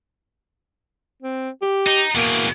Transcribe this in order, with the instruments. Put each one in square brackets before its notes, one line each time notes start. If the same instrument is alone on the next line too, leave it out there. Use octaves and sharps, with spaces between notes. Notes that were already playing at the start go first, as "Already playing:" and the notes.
[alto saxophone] C4
G4
[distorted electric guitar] D#4
[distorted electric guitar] E2 B2 [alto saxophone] A#3